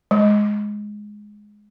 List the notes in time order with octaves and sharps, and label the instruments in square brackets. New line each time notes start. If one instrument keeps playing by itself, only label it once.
[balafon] G#3